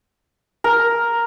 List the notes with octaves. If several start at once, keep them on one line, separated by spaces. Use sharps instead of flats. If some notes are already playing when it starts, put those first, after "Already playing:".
A#4